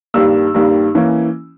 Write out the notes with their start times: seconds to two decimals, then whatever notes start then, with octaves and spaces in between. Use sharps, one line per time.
0.14 G2 D#3 G3 A#3 E6
0.54 G2 D#3 G3 A#3
0.95 E3 A#3 C#4